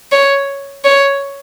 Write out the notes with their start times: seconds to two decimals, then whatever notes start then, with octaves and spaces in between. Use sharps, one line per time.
0.12 C#5
0.84 C#5